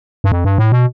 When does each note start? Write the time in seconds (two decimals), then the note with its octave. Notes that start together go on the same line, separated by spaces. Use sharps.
0.24 G2
0.32 F2
0.45 G2
0.58 A2
0.72 B2